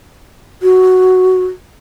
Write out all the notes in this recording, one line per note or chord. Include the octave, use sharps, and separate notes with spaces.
F#4